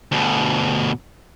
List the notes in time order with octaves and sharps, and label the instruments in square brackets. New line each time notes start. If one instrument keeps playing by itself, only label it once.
[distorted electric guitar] D2 B2